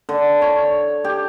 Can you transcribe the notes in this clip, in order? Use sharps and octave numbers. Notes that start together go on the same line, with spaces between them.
D3
C#5
G4